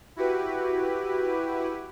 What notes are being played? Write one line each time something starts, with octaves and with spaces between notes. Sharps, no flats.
E4 F#4 G4 B4